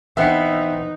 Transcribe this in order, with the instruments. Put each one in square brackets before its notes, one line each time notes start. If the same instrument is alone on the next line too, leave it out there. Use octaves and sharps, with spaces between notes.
[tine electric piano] E3 [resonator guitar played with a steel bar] B3 C4 [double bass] D#4 [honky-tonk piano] E5 F#6 C#7